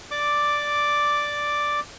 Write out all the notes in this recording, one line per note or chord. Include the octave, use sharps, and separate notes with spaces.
D5 D6